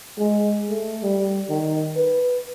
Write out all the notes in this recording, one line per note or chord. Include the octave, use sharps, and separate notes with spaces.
G#3
A3
G3
D#3
B4